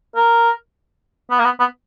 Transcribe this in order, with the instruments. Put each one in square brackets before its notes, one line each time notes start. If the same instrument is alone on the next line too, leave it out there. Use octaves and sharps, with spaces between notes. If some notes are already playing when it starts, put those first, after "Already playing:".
[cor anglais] A#4
B3
A#3
B3
B3